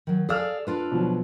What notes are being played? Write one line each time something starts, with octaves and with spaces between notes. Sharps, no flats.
D#3 F#3
G#4 A4 D5 F5 E6 F6
D4 F4 B4
B2 F3 F#3